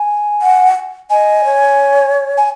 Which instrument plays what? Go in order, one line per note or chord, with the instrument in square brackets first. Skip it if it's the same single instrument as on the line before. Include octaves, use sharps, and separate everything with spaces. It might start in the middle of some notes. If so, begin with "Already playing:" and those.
Already playing: [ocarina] G#5
[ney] F#5
[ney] D#5 [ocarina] G#5
[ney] C#5
[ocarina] G#5